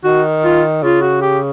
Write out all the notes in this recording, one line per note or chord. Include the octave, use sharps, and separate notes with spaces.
D#3 F#4
F4
C#3 F4
F#4
G4